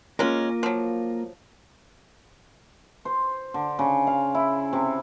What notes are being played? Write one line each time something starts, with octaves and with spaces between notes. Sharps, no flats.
G#3 A#3 C#4 F4 A#4
F3 F#3
C5
D3
C#3
F5
E4
C3